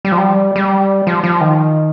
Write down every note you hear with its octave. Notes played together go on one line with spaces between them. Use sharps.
G3
F3
G3
G3
F3
F3
D#3